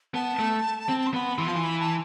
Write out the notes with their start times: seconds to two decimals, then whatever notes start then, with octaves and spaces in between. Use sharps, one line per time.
0.14 B3 A5
0.39 A3
0.89 C4
1.06 C6
1.14 B3 B5
1.38 E3 C6
1.47 F3
1.55 E3
1.63 B5
1.80 A5